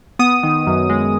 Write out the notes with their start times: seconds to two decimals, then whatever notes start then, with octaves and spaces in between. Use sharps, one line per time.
0.19 B3 D#6
0.43 D#3
0.67 F#2
0.89 G#3